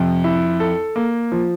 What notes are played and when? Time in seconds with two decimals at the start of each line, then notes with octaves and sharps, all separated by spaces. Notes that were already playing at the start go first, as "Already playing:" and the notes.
Already playing: F2 C3
0.24 E4
0.60 A4
0.96 A#3
1.32 F3